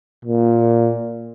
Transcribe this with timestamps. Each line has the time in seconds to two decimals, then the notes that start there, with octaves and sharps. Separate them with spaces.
0.25 A#2